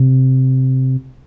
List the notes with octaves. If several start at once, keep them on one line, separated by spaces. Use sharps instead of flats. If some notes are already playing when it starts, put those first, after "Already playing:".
Already playing: C3